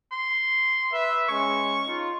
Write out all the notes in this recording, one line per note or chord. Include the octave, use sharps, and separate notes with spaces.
C6
B4 E5
G#3 C#4 C#6
D#4 F4